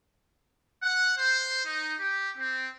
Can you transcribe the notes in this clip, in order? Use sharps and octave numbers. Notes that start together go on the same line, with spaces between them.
F#5
C5
D#4
G4
C4